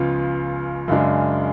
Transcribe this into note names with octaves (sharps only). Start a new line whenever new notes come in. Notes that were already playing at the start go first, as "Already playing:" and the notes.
Already playing: C#2 C#3 F3 B3 F4
F#2 C#3 G#3 D4